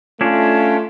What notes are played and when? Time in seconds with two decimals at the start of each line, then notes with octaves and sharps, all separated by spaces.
0.21 A3 C#4 D4 F4